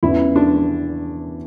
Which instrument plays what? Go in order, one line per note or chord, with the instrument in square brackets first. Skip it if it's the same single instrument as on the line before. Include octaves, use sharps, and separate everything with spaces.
[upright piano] E2 C#3 E3 [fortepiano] E4
[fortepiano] D4